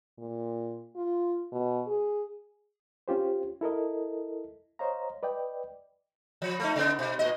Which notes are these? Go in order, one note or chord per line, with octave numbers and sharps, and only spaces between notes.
A#2
F4
B2
G#4
C#4 F4 G4 C5
E4 A4 A#4 D#5
C5 C#5 D#5 F5 A#5
B4 D5 D#5 G5
F3
A3 D#4
C#3 B3
B2
A#2 D#5